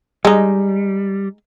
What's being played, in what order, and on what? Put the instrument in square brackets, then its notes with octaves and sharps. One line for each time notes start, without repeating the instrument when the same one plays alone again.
[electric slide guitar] G3 [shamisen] G#3 D#4